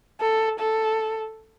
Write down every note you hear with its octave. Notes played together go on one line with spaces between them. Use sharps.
A4
A4